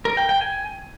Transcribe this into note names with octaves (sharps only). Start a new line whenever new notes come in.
A#4
G5
G5
G#5